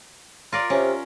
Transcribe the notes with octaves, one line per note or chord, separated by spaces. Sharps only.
F4 A#4 D5
C3 C#4